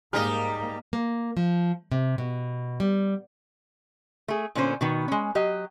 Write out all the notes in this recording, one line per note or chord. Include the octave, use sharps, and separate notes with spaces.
G#2 G3 A#3 D#4 G#4 D#5 A#5 F6
A#3
F3
C3
B2
G3
A3 G#4
A#2 D3 B3 C#4 E4 C5
B2 D#3 B3
G#3 C#4
F#3 G4 D#5